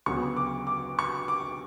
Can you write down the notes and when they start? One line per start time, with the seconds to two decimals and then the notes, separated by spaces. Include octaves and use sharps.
0.06 D2 C#3 F#3 B3 C#6
0.36 D6
0.67 D6
0.99 C#6
1.28 D6